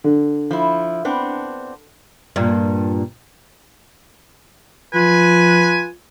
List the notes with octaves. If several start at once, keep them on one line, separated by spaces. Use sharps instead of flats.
D3
F3 E4
B3 C4 D4
G2 A#2
F3 F4 B4 G#5